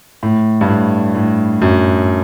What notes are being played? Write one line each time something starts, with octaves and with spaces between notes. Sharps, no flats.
A2
G2
A2
A2
F#2